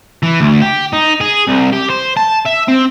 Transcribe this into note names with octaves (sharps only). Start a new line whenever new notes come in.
E3
D2
G4
D#4
G#4
C2
G4
C5
A5
E5
C4